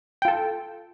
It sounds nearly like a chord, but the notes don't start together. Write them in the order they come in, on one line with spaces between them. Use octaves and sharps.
G5 F4 A4